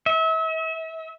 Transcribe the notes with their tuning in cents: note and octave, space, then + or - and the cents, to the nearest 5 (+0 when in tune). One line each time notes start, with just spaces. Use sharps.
E5 -35